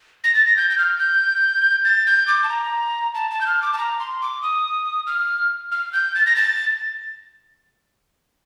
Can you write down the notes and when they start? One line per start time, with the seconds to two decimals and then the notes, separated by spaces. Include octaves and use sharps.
0.24 A#6
0.34 A6
0.46 A#6
0.57 G6
0.70 G6
0.78 F6
0.99 G6
1.85 A6
2.07 G6
2.27 D6
2.44 A5
2.49 A#5
3.15 A5
3.31 A5
3.41 G6
3.47 F6
3.62 D6
3.73 A5
3.78 A#5
4.00 C6
4.22 D6
4.42 D#6
5.07 F6
5.72 F6
5.93 G6
6.15 A6
6.26 A#6
6.36 A6